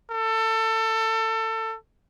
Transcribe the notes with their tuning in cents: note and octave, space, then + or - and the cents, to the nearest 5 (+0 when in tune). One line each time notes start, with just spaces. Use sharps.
A4 +25